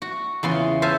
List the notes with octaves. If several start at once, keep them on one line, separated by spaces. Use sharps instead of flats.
F#4
E2 C#3 F4 C6
A4 C5 E5 F5 G#5 A5